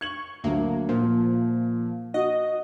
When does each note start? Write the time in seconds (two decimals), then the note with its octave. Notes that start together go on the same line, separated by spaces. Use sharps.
0.01 C#6 G#6 F#7
0.44 D2 F#3 A#3
0.89 A#2 F3
2.14 F#4 D#5